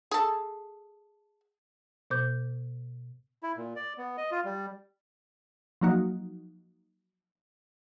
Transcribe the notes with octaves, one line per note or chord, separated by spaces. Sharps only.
G#4 A4
B2 B3 C5 D6 G6
E4
A#2
D5
B3
D#5
F4
G3
F3 F#3 A#3 D#4 F#4